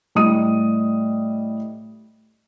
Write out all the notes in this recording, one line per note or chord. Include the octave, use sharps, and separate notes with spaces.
A2 G3 D#5 D#6 D#7